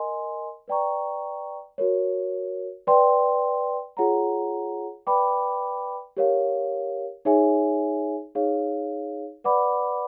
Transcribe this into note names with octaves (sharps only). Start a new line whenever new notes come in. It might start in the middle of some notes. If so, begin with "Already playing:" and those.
Already playing: A#4 D#5 G#5 C6
B4 D5 G5 A#5 C#6
F#4 A#4 C#5
B4 D5 G5 C6
F4 G#4 C#5 F#5 A#5
B4 D5 G5 B5 D6
G4 A#4 C#5 F5
D#4 G#4 C#5 E5 G#5
D#4 G#4 C#5 F5
B4 D5 F#5 B5 D6